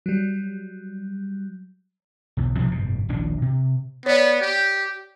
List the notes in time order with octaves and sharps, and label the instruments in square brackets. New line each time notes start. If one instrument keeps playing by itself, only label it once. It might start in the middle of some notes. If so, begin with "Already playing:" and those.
[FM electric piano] F#3 G3
[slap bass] B1 E2
B2 F3 G3 C4
F#1 G#2 B2
D#1 A#1 C#3 D4
C3
[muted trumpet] B3 [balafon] C#5 D5
[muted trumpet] G4